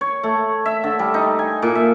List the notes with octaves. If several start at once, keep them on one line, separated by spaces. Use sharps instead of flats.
C#5
A3
E5
D3
G3
D#4
G#5
A#2
E5